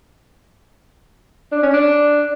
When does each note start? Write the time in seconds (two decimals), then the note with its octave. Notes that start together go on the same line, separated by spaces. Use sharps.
1.52 D4
1.62 C#4
1.73 D4